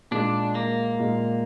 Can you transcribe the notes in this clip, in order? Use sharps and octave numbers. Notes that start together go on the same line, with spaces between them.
A#2 G#3 D4 D#4
A#3
A#2 G#3 D#4